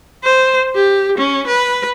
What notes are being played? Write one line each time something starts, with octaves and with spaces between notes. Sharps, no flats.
C5
G4
C#4
B4